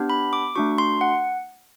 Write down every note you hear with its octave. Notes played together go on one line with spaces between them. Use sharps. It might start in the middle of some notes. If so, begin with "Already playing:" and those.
Already playing: B3 D4 G4
B5
D6
A3 D4 F#4 C#6
C6
F#5